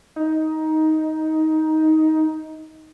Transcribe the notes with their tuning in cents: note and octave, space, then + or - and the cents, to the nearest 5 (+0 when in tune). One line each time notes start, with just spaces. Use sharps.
D#4 +15